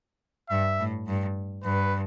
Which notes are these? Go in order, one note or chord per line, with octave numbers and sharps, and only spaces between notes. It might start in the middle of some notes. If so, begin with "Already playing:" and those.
G2 E5
A2
G2
G2 B4